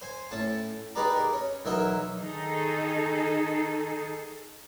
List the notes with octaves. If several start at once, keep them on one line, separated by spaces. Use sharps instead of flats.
C5 G#5
A2 C#4 A5
D#4 G4 G#4 B4 D5 A#5
A#4
C#4
B1 E3 F#3 A#4 D#5 E5
D#3 D#4 G#4 A4